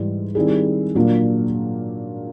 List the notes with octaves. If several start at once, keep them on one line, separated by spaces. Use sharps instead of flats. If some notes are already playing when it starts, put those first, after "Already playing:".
Already playing: G#2 E3 G3
D#3 G3 C4 E4 G#4
A#2 F#3 A#3 D4 F4